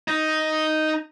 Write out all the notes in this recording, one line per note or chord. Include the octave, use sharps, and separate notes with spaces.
D#4